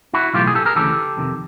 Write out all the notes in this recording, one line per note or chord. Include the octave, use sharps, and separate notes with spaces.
E4 F#4
B1 A2 E3 F4 G4
G#4
G4 A4
G#4 A#4
D2 C#3 E3 G4 A4
F2 C3 D#3